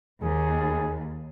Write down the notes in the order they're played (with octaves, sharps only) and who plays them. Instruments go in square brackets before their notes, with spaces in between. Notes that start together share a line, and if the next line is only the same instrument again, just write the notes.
[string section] D#2 [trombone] G#4